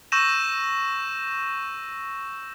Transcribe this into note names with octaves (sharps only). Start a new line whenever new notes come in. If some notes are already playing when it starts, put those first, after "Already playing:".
C#6 E6 G6 A#6 D#7 E7